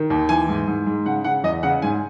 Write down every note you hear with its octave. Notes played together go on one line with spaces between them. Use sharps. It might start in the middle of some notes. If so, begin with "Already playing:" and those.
Already playing: D#3
D#2
E3 G#5
G#2
G#2
G#2
C#3 F#5
C#3 F#5
E2 D#5
C#3 F#5
G#2 G#5